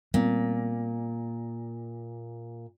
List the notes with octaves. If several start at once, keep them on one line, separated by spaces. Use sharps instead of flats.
A#2 G3 B3 C4